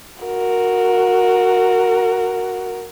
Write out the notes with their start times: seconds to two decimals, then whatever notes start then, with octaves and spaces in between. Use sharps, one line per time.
0.23 F#4 A#4